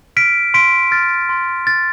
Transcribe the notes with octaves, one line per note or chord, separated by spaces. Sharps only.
F6 B6 D7
C6 B6 D7
F6 A6
C6
F6 A6